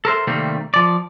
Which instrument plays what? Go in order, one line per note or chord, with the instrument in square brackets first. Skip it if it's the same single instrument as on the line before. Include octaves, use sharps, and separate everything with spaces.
[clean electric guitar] A4 A#4 C5 E5
C3 D#3 G3 A3 A#3 C4
F3 D5